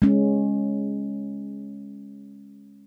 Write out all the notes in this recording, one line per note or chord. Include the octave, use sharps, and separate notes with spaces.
G#3 C#4